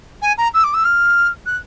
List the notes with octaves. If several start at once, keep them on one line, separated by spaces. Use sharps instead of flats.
G#5
A#5
E6
D6
E6
F6
F#6